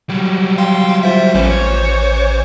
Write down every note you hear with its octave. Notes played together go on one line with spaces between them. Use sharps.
F#3 G3
F5 G5 C6
F4 C5 E5
A1 E3 A3 C#4 C5
C#5